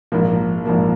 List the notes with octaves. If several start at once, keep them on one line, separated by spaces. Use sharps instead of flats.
A#1 G#2 F3 A#3
A#1 G#2 F3 A#3